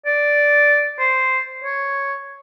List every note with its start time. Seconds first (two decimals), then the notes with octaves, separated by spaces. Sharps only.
0.06 D5
0.99 C5
1.64 C#5